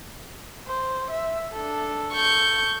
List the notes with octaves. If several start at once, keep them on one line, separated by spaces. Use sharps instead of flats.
C5
E5
D4 A4
A4 C#6 G6